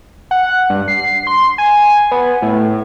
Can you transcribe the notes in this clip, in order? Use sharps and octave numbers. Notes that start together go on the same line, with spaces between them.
F#5
G2
C7
C6
G#5
B3
A2